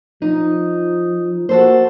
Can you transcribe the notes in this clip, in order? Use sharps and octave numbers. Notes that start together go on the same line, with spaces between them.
F3 D#4
A#3 F#4 A4 C5